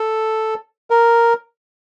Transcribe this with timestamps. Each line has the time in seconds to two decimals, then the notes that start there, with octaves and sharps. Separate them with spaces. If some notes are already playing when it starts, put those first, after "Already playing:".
Already playing: A4
0.90 A#4